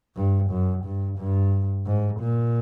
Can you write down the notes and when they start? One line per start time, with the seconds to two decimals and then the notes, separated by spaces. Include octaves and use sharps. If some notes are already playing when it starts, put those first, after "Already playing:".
0.16 G2
0.51 F#2
0.85 G2
1.19 G2
1.86 G#2
2.20 A#2